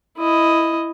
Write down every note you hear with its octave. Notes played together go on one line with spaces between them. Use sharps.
E4 D#5